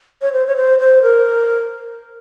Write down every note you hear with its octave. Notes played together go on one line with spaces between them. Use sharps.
C#5
C5
C#5
C5
C5
A#4